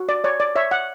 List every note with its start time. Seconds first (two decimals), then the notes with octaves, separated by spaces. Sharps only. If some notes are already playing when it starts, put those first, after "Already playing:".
Already playing: F#4
0.09 D5
0.24 C#5 D5
0.40 D5
0.56 C#5 E5
0.71 F#5